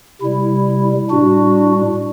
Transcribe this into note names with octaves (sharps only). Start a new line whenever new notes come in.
C3 G3 E4
A2 G3 D4 F#4